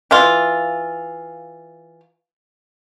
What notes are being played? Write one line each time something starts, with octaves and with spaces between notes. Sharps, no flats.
E3 F4